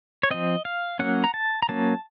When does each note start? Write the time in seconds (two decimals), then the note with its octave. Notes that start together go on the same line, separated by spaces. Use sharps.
0.23 C#5
0.31 F3 C4 D#5
0.65 F5
0.99 F#3 A#3 C#4 F#5
1.24 A#5
1.34 A5
1.62 A#5
1.69 F#3 A#3 C#4 A5